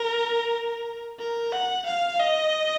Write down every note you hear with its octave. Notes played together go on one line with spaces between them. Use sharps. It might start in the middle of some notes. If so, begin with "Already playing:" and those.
Already playing: A#4
A#4
F#5
F5
D#5